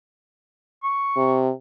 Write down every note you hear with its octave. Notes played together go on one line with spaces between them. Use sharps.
C#6
C3